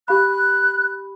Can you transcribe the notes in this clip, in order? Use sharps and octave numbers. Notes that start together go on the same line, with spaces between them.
G4 F5 B5 F#6